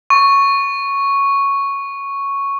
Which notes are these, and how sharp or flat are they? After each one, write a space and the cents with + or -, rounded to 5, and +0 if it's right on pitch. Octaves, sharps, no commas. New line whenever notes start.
C#6 +0